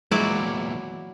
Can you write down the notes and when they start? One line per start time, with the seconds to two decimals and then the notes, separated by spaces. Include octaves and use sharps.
0.11 E2 A#2 F#3 G#3 E4 D5